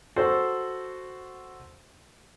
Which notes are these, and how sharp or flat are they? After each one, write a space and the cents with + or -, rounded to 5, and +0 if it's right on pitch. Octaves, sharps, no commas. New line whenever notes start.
F#4 +0 A4 +0 C5 +0